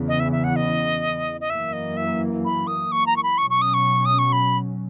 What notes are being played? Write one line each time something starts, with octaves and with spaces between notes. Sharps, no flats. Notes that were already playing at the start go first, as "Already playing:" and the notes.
Already playing: E2 C#3 E3 B3
D#5
E5
E5
F#5
D#5
D#5
F#2 E3 A#3 E5
D#5
E5
B5
D#6
C#6
A#5
C#6
B5
B2 F#3 C#4 C#6
C#6
D#6
C#6
D#6
C#6
B5